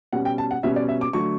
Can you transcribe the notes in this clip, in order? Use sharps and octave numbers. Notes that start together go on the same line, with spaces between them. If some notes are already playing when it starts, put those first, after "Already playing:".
B2 G3 C#4 F#5
G5
A5
F#5
B2 G3 C#4 E5
D5
E5
D6
D3 F#3 A3 C#6